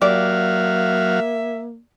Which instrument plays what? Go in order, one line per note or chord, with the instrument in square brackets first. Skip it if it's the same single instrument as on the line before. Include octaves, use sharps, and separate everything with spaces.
[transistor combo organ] F#3 F5 [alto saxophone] A#3 [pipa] G4 D5 [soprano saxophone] E5